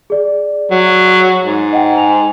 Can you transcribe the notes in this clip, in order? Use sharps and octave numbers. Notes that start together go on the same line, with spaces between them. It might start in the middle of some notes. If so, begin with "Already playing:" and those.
G#4 D5
F#3
G#2
D#5 F#5 G5
G#5 F7